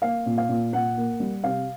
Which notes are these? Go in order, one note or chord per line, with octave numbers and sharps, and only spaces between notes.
A#3 F5
A#2
F5
A#2
A#2 F#5
A#3
G3
C3 F5